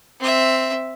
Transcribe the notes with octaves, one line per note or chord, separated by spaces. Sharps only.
C4 E5